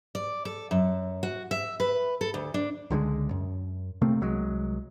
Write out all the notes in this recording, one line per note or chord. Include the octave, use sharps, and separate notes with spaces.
D5
A4
F#2
F#4
E5
B4
A4
D2
D4
C#2 D3 D#3 G#3
F#2
C3 A3 A#3 C4
C2 F#3 G#3